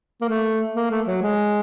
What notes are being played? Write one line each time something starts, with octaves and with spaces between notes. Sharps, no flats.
A#3
A3
A#3
A3
F#3
G#3